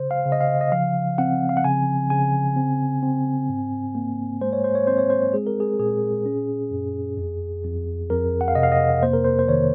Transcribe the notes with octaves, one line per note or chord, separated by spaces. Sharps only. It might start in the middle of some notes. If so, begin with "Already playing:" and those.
Already playing: C#3 C5
F5
C#3
D#5
F5
D#5
F3 F5
C4 F#5
F5
F#5
C#3 G#5
C#3 G#5
C4
C4
G#2
A#3
G#3 C5
C#5
C5
C#5
C4 C5
C#5
C5
G#3 G#4
A#4
G#4
A#2 G#4
C#4
F#2
F2
F2
F2 A#4
F#5
F5
C3 D#5
F5
D#5
A#3 C5
A#4
C5
C5
D#3 C#5